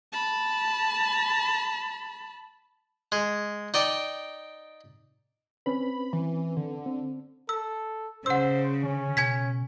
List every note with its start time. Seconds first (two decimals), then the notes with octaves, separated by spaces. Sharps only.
0.12 A5 B5
3.12 G#3
3.74 D#4 D5 G5
5.66 C4 C#4 B4 B5
6.13 E3
6.57 D3
6.86 C4
7.49 A4 E6
8.26 C#3 C5 F#5 E6
8.83 D3 C#4
9.17 B2 G#5 G#6 B6